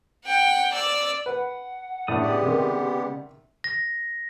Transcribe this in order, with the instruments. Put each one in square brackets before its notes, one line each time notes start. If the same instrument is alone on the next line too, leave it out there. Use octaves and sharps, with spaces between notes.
[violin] F#5 G5
D5 E6
[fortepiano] B4 [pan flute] F#5
[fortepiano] A2 D4 [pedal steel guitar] C#3 D5 D#6
[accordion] G#3 B3 G4
[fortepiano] C3 D#3 [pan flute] F#5
[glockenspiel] A#6